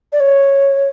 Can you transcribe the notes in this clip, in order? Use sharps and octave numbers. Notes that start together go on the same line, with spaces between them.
D5
C#5